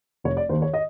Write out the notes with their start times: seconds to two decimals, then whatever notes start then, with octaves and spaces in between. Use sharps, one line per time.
0.24 F1 C#5
0.37 D5
0.49 D#2 D#3 C5
0.62 C#5
0.73 D#5